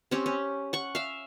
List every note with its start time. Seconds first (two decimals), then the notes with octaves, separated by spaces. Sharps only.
0.11 C4 C#4 G4
0.26 C#4
0.73 F#5 C#6
0.95 E5 F5